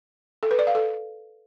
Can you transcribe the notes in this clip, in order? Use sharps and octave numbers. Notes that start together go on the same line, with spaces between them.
A4
B4
D5
F5
A4